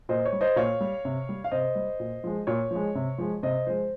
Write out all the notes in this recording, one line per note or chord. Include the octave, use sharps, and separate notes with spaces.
A#2 C5 D#5
C#5
G3
C5 D#5
A#2 C#5 F5
G3
C3
G3
F5
C3 C5 D#5
G3
A#2
F3 G#3
A#2 C#5
F3 G#3
C3
F3 G#3
C3 C5 D#5
F3 G#3 C5